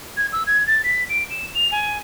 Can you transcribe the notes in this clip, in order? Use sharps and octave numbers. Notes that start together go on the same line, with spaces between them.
G#6
E6
G#6
A6
B6
D7
E7
F7
G#5